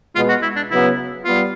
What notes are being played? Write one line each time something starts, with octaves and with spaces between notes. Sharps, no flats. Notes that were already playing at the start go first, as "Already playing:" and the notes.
B2 G#3 B3 F4
F#4
E4
D4
C#3 F#3 B3 E4
G3 B3 F4